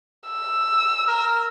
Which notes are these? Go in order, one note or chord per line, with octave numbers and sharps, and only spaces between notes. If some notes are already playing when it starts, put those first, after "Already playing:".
E6
A#4